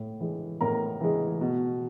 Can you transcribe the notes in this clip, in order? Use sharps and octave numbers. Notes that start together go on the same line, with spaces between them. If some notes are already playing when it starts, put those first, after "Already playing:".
Already playing: A2
E3 G#3
A2 A#4 A#5
E3 G#3
B2